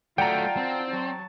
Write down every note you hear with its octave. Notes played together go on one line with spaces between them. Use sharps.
F#3 A3 F4 D5 F#5 G5 A5 A#5
C4
F#3 A5